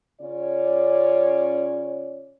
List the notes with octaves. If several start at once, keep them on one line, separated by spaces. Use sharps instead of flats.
C#3 C#4 F4 C#5 D5